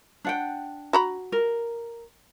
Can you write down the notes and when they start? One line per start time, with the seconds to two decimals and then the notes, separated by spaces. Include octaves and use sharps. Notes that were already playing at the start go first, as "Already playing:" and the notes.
0.25 D4 F#5 G5
0.93 F#4 A#5 B5
1.32 A#4